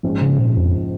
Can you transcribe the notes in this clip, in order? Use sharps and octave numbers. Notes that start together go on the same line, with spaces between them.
A#1 G#2 F3 C#4
C#3
A#2
F2